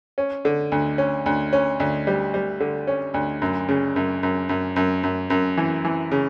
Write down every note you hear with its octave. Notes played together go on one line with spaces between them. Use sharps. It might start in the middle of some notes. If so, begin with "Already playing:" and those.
C#4
D3
D2
C#4
D2
C#4
D2
G3
G3
D3
C#4
D2
F#2
C#3
F#2
F#2
F#2
F#2
F#2
F#2
E3
E3
C#3